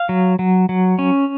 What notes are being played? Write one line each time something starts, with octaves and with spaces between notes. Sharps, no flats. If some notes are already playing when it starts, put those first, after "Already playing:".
Already playing: F5
F#3
F#3
F#3
C#4